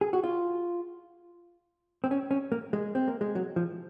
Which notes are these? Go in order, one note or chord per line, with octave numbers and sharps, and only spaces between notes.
G#4
F#4
F4
C4
C#4
C#4
A#3
G#3
C4
A#3
G#3
F#3
F3